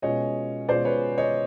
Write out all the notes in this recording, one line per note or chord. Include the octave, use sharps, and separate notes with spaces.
B2 G#3 C#4 F4 C#5 D#5
B2 G#3 C#4 F4 C5 D5
B4 C#5
C#5 D#5